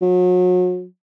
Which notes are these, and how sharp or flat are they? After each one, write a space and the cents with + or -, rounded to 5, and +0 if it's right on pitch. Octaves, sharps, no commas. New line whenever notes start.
F#3 -35